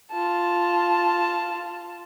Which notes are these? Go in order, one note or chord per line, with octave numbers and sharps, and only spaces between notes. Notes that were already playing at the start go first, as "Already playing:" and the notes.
F4 A5